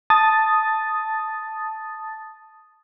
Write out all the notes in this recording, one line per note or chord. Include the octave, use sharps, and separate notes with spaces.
A5 D#6 A6